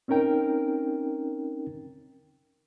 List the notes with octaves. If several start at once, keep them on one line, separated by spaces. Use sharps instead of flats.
C4 C#4 D#4 A#4 G5